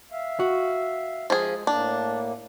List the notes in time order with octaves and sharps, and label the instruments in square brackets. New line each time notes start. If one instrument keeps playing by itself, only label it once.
[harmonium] E5 F5
[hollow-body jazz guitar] F#4
[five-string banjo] F3 G#4 [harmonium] G#3
[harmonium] A2 A#3 [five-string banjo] D4